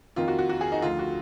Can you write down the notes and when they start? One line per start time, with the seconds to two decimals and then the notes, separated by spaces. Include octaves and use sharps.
0.16 F2 D#3 A#3 F4
0.28 F#4
0.39 F#4
0.49 F#4
0.61 G#4
0.72 D#4
0.82 D2 D3 F3 F4
0.99 F#4